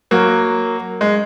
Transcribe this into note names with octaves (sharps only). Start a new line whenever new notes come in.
F#3 A#3
G#3